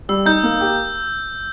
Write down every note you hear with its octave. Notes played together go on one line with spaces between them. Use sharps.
G3 E6
D#4 G6
A#3
G4